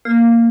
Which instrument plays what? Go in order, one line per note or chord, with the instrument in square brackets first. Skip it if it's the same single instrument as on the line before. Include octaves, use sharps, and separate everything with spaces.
[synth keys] A#3